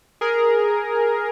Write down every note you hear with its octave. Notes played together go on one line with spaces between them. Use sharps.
G#4 A#4